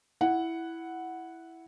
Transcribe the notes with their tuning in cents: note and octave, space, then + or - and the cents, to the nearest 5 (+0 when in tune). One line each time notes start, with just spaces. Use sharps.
E4 +0 F#5 +0